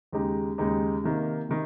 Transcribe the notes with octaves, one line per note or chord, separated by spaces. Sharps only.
D#2 C#3 G#3 D#4 G4
D#2 C#3 G#3 D#4 G4
C3 D#3 A#3
C3 D#3